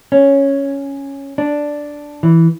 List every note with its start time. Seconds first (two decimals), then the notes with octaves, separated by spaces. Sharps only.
0.12 C#4
1.38 D4
2.23 E3